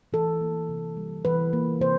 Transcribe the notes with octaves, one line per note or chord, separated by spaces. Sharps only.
E3 A4
A#3
C3
G3
E3 B4
A#3
C3 C5